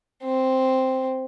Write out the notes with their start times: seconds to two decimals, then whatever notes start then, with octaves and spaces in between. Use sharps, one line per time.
0.24 C4